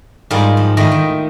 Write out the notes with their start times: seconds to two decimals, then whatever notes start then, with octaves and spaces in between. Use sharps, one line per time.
0.31 G#2 G3 F4 A#4 D#5
0.57 F3
0.77 A2 D#3 A3 D#5 G5
0.91 D#3